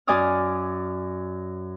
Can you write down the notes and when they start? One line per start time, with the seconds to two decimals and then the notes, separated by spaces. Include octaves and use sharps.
0.07 F#2 D5 G#5 D6 D#6 F6